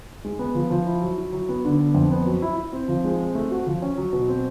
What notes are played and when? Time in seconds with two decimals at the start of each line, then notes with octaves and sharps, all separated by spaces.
0.25 G#3
0.39 B3
0.55 F3
0.70 F3
0.86 E4
1.02 F#3
1.18 E4
1.33 F#3
1.49 B3
1.65 D3
1.79 B3
1.95 F2
2.11 B3
2.26 F#3
2.42 E4
2.57 E4
2.73 C4
2.88 F3
3.05 G#3
3.19 C4
3.35 A3
3.51 F#4
3.67 F3
3.82 C#4
3.98 F#3
4.13 B2
4.28 C4